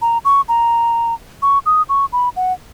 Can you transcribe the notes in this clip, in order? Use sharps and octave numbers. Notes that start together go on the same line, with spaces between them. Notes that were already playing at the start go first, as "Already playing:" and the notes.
A#5
C#6
A#5
C#6
D#6
C#6
B5
F#5